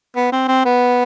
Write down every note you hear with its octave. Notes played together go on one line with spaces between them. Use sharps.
B3
C4
C4
B3